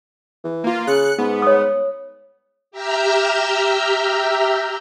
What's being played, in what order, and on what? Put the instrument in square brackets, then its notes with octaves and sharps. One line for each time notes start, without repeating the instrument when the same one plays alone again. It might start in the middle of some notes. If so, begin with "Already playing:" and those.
[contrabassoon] E3
[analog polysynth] A#3 F4
[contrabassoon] C#3 [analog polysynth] F#6 C#7
[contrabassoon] G#2 [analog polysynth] B3
[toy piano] C#5 D#6
[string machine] G4 E5 A#5 E6 F6 G6